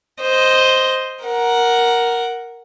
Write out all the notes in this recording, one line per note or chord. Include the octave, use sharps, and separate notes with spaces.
C5 D#5
A#4 F#5